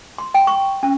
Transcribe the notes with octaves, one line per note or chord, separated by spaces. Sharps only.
C6
G5
C#6
C#4